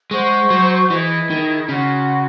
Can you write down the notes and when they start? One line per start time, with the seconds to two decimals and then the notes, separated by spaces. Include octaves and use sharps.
0.11 G#3 C5 F#5 C#6
0.50 F#3
0.90 E3 E4 G#4 D#5
1.30 D#3
1.69 C#3 F#4 C#5 F#5 C6